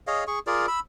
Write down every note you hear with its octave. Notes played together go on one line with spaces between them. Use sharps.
G#4 C#5 D#5 F5
G#4 C#6
F4 G#4 A#4 D5
B5 E6